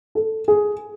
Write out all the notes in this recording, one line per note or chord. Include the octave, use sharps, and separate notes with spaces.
A4
G#4